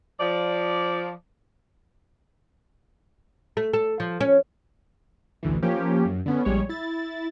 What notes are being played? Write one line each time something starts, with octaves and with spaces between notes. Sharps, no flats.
F3 D5
A3
A4
F3
C#4
A1 D2 E3
F3 A#3 C#4 G4
F#2
D3 B3 C#4
A#1 G3 G#3 C#5
E4 A6